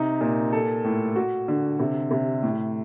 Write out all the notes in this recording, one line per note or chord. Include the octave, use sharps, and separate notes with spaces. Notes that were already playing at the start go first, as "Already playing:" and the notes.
Already playing: C3 D#4
A#2
A4
A2
F#4
D3
C3
C3
A2